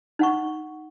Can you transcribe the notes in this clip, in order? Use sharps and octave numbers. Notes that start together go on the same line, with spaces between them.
D#4 F#5 C#6